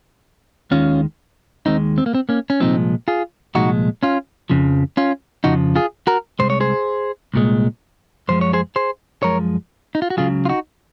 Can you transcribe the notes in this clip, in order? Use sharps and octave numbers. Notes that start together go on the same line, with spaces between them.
D#2 D#3 G#3 C#4 F4
D#2 D#3 G#3 C4 D#4
C4
A#3
C4
A#3 C#4
C#4
C2 A#2 F3 G#3 C4 D#4
F4 G#4
C2 A#2 F3 G#3 D#4 F#4
C#4 F4
F2 C#3 F3
C#4 F4
F2 C#3 F3 D#4 F#4
F4 G#4
F#4 A#4
C2 A#2 G#3 C5
C#5
G#4 C5
C2 A#2 G#3
F#2 F3 G#3 C5
C#5
G#4 C5
G#4 C5
F#2 F3 G#3 A#4 C#5
D#4
F4
F#4
C#2 C#3 F#3 F4 G#4
F4
D#4 F#4